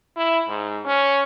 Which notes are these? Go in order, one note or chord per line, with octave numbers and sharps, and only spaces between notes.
E4
G#2
C#4